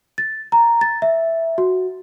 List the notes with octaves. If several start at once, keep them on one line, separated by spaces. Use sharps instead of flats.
A6
A#5
A6
E5
F#4